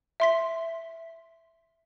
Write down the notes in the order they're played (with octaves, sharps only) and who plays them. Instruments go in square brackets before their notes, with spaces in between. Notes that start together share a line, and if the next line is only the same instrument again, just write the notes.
[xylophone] E5 C6 B6